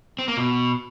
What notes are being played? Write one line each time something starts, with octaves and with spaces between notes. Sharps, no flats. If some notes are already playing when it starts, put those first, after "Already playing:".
C4
A#3
B2